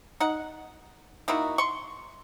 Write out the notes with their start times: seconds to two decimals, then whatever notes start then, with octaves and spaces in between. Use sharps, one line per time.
0.20 D#4 F#5
1.28 A#3 D#4 E4 F#4
1.58 C6 C#6